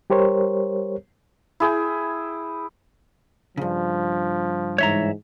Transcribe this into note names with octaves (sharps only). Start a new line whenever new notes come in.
G3 G4 A#4 C5 C#5
E4 G#4 G5
G2 C#3 F3
G#2 E3 C#5 E5 A#5